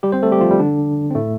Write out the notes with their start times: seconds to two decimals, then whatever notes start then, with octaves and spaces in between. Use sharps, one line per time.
0.03 G3 G4
0.12 C4 C5
0.23 A3 A4
0.31 G3 G4
0.41 F3 F4
0.51 G3
0.59 D3 D4
1.10 C4
1.15 A2 A3